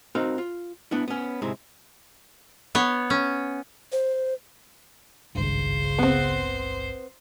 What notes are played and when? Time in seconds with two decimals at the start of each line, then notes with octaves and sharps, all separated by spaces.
0.15 C4 D#4 F#4 A#4 F5
0.38 F4
0.91 B3 D4 E4
1.08 B3 C#4
1.42 G#2 C3 G#3 E4
2.75 B3 C#5
3.10 C#4
3.92 C5
5.35 G#1 C#2 G2 C#3 C5
5.99 B3 C4